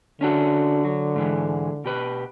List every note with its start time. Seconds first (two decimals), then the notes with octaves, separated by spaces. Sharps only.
0.21 D3 C#4 D4 F#4
0.85 F#3
1.16 G#2 E3 G#3
1.84 B2 G4 B4